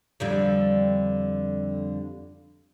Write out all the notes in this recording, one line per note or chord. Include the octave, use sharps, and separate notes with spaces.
F2 D3 G3